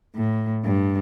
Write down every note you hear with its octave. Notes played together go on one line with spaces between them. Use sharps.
A2
G2